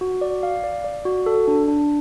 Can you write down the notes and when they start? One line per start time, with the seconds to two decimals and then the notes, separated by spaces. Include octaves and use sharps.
0.01 F#4
0.21 D5
0.43 F5
0.64 D5
0.84 D5
1.05 F#4
1.26 A4
1.48 D4
1.68 D4